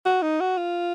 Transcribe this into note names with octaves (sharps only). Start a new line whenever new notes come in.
F#4
D#4
F#4
F4